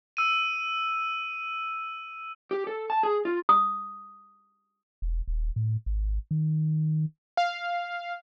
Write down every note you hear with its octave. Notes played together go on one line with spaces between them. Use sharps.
E6 D#7
G4
A4
A5
G#4
F4
D#6
E1
D#1
A2
G#1
D#3
F5